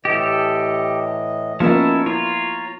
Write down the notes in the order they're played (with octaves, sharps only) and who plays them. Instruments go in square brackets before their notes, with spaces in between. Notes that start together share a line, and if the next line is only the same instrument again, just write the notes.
[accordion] A2 E3 D#5 [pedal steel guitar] G4 A4
[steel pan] F3 A#3 B3 [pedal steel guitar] C#4 E4 A4 [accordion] D#4
[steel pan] E4 [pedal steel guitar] F4 C#5 [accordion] A#5